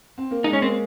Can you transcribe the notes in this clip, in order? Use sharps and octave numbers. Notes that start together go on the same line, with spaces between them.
C4
A#3
G#3 D#4
C#4
A#3 C4